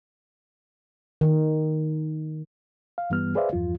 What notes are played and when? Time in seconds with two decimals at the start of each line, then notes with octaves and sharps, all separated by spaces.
1.21 D#3
2.98 F5
3.10 G2 E3 G3 B3 F6
3.35 G#4 B4 C5 D5 E5 F5
3.53 E2 G2 F3 F4